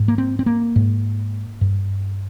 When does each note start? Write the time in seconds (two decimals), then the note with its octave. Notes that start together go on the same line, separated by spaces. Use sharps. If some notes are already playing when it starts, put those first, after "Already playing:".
Already playing: G#2
0.08 A#3
0.18 C4
0.39 C4
0.46 A#3
0.76 G#2
1.61 G2